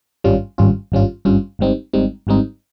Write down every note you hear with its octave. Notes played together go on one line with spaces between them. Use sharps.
G#1 G2 G3 C#4 F4
G#1 G2 G3 C#4 F4
G#1 G2 G3 C#4 F4
G#1 G2 G3 C#4 F4
G#1 G#2 G3 C4 D#4
G#1 G#2 G3 C4 D#4
G#1 G#2 G3 C4 D#4